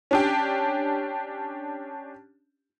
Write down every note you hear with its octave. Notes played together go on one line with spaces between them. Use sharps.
C#4 D4 G4